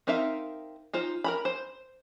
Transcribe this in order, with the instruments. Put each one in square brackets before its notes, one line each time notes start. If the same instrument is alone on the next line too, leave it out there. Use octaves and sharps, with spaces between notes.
[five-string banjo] C4 D#4 A#4 E5 F5
D#4 F4 C5
A#4 A#5 B5
C5